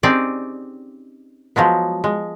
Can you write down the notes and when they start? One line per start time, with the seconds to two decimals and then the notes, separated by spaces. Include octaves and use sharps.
0.03 C4 C#4 D#4 G4 G#4 D5
1.56 F3 F#3 G#3 B3
2.04 G#3